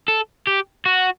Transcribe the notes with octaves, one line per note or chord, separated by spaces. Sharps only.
A4
G4
F#4